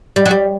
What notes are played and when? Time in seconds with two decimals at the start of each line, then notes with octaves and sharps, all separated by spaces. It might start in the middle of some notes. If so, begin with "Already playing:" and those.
0.16 G3
0.26 F#3
0.31 G3